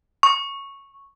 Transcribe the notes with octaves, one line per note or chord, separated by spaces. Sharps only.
C#6